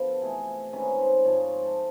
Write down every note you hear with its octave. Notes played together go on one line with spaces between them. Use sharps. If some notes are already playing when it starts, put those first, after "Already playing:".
Already playing: D3 F3 B3
A4
C3 E3 A3 G#4
C3 D#3 G#3 C#4 B4
C5
G#2 F3 G#3 C#5
C#5
C5
A4